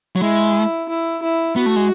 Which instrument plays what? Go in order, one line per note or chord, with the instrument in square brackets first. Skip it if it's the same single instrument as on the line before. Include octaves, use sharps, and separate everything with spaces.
[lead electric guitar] F#3
[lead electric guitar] G#3 [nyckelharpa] E4
[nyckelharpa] E4
E4
[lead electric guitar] B3 [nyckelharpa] F#4
[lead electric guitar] A3
G#3